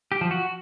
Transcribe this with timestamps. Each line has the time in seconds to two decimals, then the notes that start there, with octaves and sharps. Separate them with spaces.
0.12 G4
0.21 F3
0.31 F#4